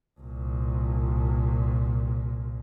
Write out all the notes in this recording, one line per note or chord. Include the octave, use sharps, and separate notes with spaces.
C2 A#2